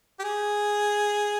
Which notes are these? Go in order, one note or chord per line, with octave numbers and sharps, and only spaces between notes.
G4
G#4